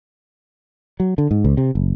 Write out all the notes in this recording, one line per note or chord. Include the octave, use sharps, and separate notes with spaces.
F#3
D3
G#2
C#2
C3
F#1